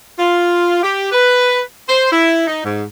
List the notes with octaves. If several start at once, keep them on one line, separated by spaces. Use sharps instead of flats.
F4
G4
B4
C5
E4
D#4
G#2